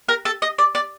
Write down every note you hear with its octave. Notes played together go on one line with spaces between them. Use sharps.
A#4
A4
D#5
D5
D5